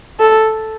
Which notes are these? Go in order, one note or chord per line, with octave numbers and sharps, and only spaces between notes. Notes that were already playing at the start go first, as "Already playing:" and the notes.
A4